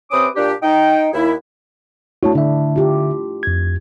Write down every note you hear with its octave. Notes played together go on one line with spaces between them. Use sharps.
C3 C4 C#4 B4 D6 D#6
A#2 D4 G4
D#4 G5
D#2 E4
A3 D4 E4 F#4 C#5 A5
D3 D4 E5
F4 G4
F2 G#6